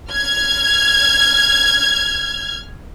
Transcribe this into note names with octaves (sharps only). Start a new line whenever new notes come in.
F6 G#6